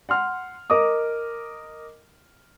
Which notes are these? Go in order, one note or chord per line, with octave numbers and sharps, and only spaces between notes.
F#5 C6 F6
A#4 D#5 D6 D#6